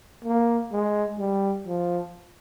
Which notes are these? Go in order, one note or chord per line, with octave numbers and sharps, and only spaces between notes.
A#3
G#3
G3
F3